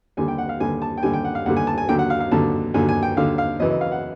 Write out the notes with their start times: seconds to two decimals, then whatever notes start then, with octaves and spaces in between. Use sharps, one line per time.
0.17 D#2 D3 G3 G#5
0.28 G5
0.38 F#5
0.49 F5
0.60 D#2 D3 G3 G#5
0.82 A5
0.97 G5
1.03 D#2 D3 G3 G#5
1.13 G5
1.25 F#5
1.35 F5
1.46 D#2 D3 G3 F#5
1.57 G#5
1.67 A5
1.78 G#5
1.89 D#2 D3 F#3 G5
1.99 F#5
2.10 F5
2.20 F5
2.31 D#2 D3 F#3 A5
2.74 D#2 D3 F#3 G#5
2.89 G#5
3.03 G5
3.17 D#2 D3 F#3 F5
3.38 F5
3.60 F#2 C#3 E3 D#5
3.70 D#5
3.81 F5
3.92 F#5